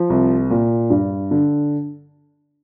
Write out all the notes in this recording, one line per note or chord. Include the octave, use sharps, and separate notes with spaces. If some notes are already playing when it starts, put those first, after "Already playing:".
Already playing: F3
C2
A#2
G2
D3